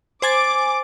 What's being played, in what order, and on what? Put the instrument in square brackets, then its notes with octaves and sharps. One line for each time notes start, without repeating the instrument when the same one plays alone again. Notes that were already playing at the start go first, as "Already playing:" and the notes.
[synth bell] C5 G#5 A6 [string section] D6